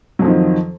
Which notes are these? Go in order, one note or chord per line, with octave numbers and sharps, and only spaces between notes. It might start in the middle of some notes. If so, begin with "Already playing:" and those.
F2 D#3 F3 F#3